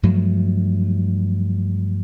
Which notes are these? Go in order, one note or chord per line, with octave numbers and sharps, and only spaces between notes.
G2 F3 F#3 A3